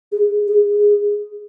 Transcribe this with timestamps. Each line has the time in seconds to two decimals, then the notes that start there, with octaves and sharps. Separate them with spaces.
0.12 G#4
0.30 G#4
0.48 G#4
0.67 G#4